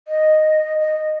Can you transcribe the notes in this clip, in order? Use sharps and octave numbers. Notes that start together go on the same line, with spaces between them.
D#5
D#5